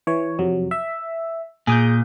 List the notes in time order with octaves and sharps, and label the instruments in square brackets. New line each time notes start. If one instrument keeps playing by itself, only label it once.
[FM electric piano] E3 C#5
F2 C3 F#3
E5
[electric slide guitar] A#2 [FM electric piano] G#4 D#6 G6